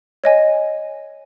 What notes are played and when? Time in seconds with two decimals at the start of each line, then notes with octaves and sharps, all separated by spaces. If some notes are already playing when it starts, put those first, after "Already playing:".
0.24 C#5 D#5 G#5